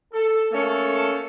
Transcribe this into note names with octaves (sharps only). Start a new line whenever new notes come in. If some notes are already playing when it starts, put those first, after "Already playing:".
A4
A3 A#3 C#4 A4